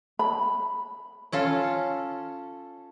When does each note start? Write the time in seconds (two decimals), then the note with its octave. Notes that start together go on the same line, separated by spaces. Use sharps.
0.19 B5
1.32 C#4 F4 A4